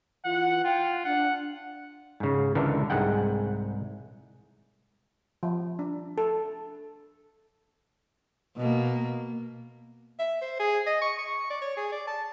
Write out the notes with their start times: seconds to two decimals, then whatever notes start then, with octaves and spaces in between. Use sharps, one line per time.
0.25 E3 F4 F#5
0.64 F4 G5
1.05 D4 F#5
2.20 G#2 C#3
2.55 C#2 D3 E3 A4 A#4
2.90 C2 G#2 G#3 F#5 G5
5.43 F3
5.79 D4
6.18 A4
8.57 B2 A#3
10.19 E5
10.41 C5
10.59 G#4
10.87 D#5
11.02 C#6
11.19 C#6
11.50 D5
11.62 C#5
11.77 G#4
11.92 D5
12.07 A5